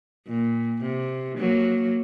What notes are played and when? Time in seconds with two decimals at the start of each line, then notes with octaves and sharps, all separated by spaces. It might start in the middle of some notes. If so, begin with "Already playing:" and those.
0.27 A#2
0.82 C3
1.38 F#3 A#3